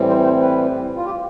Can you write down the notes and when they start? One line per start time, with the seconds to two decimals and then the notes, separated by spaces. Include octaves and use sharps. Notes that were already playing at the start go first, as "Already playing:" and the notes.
Already playing: A2 E3 G3 C4
0.09 C5
0.24 C5
0.41 B4
0.96 F4
1.06 G4